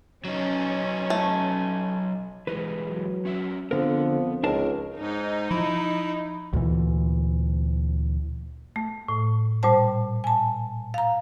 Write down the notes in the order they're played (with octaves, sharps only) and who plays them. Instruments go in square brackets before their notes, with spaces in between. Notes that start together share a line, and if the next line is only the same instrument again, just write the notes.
[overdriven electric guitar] F#3 D#4 [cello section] C#4 [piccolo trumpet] G#5
[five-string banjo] A3
[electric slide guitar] E3 G3 G#3 [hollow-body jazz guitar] B4
[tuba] F#3
[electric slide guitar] C#4 F#4 E5
[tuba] F2 [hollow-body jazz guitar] D3 A#4 [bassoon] F3 [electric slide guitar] B3
[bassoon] C#2 [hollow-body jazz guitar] D#4 A5 [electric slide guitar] A#4
[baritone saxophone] G#2 [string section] D#4
[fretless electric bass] F3 [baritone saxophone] E4
[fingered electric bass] D2 A#2 E3
[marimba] A3
A2
A#2 G3 C5 A5
G#5 A5
F5 A#5